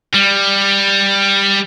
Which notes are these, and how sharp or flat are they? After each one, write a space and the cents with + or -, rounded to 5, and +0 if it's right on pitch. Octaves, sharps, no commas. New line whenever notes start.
G3 +10